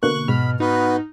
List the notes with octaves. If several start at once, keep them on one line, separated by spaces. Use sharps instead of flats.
B2 D3 A#3 C#6 F#6
G#2 B2 B5 F6
B3 D#4 F#4 B4